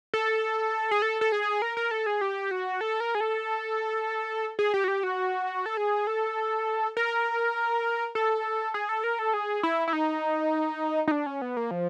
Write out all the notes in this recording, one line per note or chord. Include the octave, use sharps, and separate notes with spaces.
A4
G#4
A4
A4
G#4
A#4
A#4
A4
G#4
G4
F#4
A4
A#4
G#4
A4
G#4
G4
F#4
G4
F#4
A4
G#4
A4
A#4
A4
G#4
A4
A#4
A4
G#4
E4
E4
D#4
D#4
D4
C#4
B3
A#3
F3